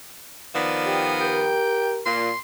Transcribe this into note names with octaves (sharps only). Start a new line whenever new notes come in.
D#3 F3 B3 D5
G4
G4 A#4 G5
A#2 C6